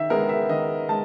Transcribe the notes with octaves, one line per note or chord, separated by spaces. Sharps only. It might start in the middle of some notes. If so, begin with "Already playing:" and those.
Already playing: D#3 E5
G#3 B3 A#4
E5
D#3 D#5
G#3 A5